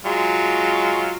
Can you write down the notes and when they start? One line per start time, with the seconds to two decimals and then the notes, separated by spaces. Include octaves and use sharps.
0.05 F#3 G#3 F4